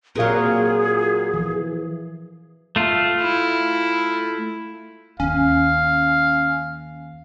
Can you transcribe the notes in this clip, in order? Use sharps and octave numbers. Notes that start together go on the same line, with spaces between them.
A#2 F#3 C4 G#4 A#4 F5
E3 F3
A3 F4
E4
D#2 C#4 F5